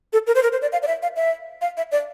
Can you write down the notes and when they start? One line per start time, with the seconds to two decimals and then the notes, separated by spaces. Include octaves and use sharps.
0.13 A4
0.27 A#4
0.35 C5
0.43 A#4
0.52 C5
0.62 D5
0.73 F5
0.83 D5
0.87 E5
1.03 F5
1.16 E5
1.61 F5
1.77 E5
1.92 D5